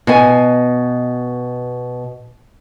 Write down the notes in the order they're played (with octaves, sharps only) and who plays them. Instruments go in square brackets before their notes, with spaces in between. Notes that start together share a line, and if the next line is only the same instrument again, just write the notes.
[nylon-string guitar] B2 G#5